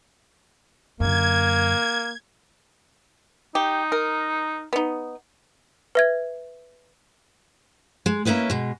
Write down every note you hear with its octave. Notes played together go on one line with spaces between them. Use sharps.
F#2 D3 A#3 G#6
D#4 G4
A#4
B3 D#4
B4 E5 G#6
G#3
A#3 C#4 E4 B4 D#5
B2 G#3